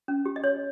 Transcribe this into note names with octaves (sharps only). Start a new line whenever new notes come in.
C#4
G4
D#5
C#5